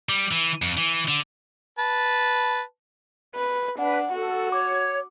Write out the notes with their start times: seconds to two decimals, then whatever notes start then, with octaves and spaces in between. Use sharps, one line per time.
0.09 G3
0.32 E3
0.62 F2
0.77 E3
1.08 D3
1.78 B4 A5
3.35 B4
3.79 D4 B4 F#5
4.12 F#4 A4
4.52 C#5 D6